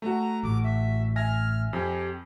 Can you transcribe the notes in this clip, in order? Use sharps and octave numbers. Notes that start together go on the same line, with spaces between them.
A3 F#4 A#5
A1 D6
E5
E5 G#5 F6 A#6
F2 G4 G#5